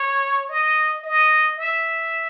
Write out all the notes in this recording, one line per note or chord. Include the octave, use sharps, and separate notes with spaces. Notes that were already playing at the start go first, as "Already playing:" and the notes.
Already playing: C#5
D#5
D#5
E5